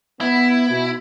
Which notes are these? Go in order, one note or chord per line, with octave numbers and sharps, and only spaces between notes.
B3 E4
B2